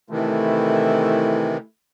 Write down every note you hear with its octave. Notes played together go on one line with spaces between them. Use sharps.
C3 D#3 E3 A3 E4